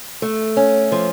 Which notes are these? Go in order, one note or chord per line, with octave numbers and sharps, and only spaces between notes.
A3
C#4
F3